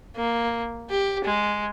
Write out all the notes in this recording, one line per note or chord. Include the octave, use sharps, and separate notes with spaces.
A#3
G4
G#3